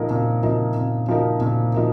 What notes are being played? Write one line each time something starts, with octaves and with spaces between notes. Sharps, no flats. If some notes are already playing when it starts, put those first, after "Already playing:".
Already playing: A#2 F3 D#4 A#4
A#2
F3 D#4 A#4
A#2
F3 D#4 A#4
A#2
F3 D#4 A#4